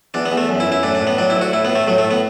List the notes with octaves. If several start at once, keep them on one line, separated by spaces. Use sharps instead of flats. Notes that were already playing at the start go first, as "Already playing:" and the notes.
E2 D4
B3
E2
A3
F#2
E4
F#2
E4
A2 D4
D4
A2
B3
F#3 D4
E4
D2
F#4
A2 E4
B3
A2
A3
A2 F#3
A3
A2
B3